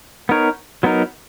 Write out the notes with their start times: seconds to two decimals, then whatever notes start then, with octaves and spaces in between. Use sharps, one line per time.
0.29 B3 D#4 A#4 C#5
0.83 F#3 B3 D#4 A#4